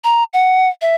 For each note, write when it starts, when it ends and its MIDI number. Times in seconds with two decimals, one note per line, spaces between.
0.04 0.24 82
0.33 0.69 78
0.82 0.95 76